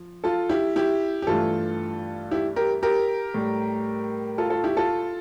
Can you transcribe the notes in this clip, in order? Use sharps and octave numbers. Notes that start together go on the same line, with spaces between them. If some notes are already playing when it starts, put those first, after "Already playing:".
Already playing: F3
F4 A4
E4 G4
E4 G4
G4
G2 E3 A3 F4 A4
E4 G4
G4 A#4
G4 A#4
A2 G3
F4 A4
F4 A4
E4 G4
F4 A4